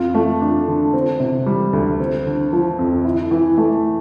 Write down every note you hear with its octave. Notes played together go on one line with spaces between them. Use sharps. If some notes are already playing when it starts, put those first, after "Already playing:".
Already playing: F2 F4
A3
D4
D3
C4
C3
G3
D2
C4
D3
F3
F2
E4
E3
A3